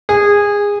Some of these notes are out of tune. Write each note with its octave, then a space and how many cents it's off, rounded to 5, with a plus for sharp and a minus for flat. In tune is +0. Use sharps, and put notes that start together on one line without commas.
G#4 -20